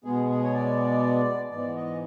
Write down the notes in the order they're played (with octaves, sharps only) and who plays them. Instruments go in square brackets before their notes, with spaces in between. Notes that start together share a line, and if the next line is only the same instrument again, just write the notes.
[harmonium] B2 G#3 B3 G#4
G#4
C#5
D5
G#2 E3 G#3 B3 D5
D#5